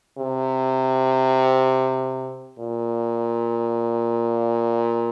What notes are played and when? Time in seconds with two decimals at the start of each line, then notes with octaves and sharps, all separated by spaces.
0.18 C3
2.59 A#2